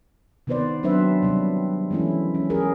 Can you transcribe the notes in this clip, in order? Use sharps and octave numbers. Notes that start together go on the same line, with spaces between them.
C3 D#3 B3 B4 C5 D5
F#3 C4 D4 B4 C5 E5
C3 G3
E3 G#3 A3 C#4 E4
C#4
C#4 G#4 A#4